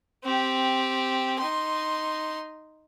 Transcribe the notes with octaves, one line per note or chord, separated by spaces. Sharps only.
C4 G4
D#4 C6